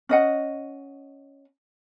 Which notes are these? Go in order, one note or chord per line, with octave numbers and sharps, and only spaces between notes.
C#4 D#5 F#5